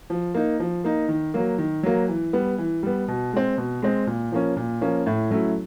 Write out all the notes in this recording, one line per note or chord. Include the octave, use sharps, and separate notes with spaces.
F3
A#3 D#4
F3
A#3 D#4
D#3
F#3 A#3
D#3
F#3 A#3
E3
G3 B3
E3
G3 B3
B2
G#3 C4
B2
G#3 C4
A#2
F3 A#3 C#4
A#2
F3 A#3 C#4
A2
F#3 A3 C#4 E4